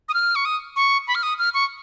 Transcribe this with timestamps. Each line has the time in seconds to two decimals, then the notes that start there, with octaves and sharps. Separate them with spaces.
0.09 D#6
0.14 F6
0.35 C#6
0.45 D#6
0.76 C#6
1.07 B5
1.15 F6
1.23 D#6
1.39 F6
1.54 C#6